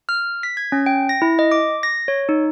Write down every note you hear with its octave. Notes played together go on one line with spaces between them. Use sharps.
F6
B6
G#6
C#4
G5
A#6
E4
D#5
D6
A#6
C#5
D#4